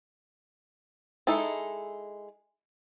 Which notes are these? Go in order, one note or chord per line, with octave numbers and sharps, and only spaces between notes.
G#3 D#4 E4 A4